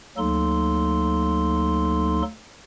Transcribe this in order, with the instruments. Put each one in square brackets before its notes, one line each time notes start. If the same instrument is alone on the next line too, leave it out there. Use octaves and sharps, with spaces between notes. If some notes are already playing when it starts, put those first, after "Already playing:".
[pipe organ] D2 F#3 A#3 D#4 A4 C6